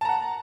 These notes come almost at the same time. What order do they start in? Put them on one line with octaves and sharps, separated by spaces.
A5 A#5 F#5